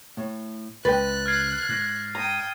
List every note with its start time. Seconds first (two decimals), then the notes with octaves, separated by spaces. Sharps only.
0.17 A2
0.85 C#2 C#3 B4 D#5 G5 F#6 A6
1.26 F6 G#6 C7
1.69 G#2
2.15 G5 A#5 D#6